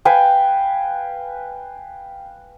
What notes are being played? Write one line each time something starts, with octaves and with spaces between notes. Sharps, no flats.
B4 F5 G5 G#5